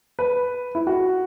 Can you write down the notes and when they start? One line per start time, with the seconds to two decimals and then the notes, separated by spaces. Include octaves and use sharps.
0.19 B4
0.75 E4
0.87 F#4